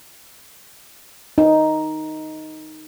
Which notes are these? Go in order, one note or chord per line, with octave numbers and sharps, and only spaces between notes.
D#4